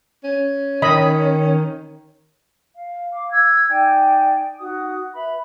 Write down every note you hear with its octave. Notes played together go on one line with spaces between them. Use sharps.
C#4
D#3 D#5 B5
F5
F5 D6
E6 G#6
D#4 D5 G5 G#5
D#4 F#4 D#6
B4 E5 B5